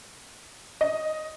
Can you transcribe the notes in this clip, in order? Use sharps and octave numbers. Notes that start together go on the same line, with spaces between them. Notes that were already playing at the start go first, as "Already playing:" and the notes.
D#5